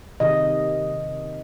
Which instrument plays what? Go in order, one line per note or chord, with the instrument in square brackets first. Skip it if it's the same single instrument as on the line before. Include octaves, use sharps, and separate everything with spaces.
[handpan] C3 D#3 D#5